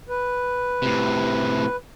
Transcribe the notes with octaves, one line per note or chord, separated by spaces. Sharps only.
B4
A2 C3